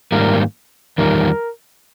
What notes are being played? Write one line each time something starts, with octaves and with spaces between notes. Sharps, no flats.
G#2 D#3 G3 A#3 A#4
E2 D#3 G3 A#4